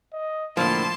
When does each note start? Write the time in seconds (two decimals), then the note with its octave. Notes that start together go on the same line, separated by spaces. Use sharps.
0.13 D#5
0.57 A2 D3 F3 A#3 A5 B5 C6